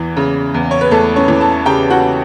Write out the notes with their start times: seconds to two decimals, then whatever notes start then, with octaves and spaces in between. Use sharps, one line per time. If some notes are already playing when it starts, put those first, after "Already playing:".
Already playing: E2 E3
0.17 C#3
0.54 E2
0.71 C#5
0.81 B4
0.91 E2 A3 A4
1.16 C#4 C#5
1.28 E3
1.41 A4 A5
1.66 C#3 G4 G5
1.90 F#4 F#5